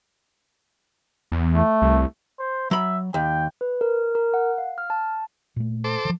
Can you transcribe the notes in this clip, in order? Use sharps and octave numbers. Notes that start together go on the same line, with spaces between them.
E2
A3
C2
C5
F#3 E5 B5
D#2 G5
B4
A#4
A#4
F#5
F5
F6
A5
A#2 A3
A4 C5 D6
D#3 F3